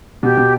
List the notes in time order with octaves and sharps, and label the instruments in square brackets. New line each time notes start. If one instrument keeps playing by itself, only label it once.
[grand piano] B2 [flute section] G4
[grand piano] B2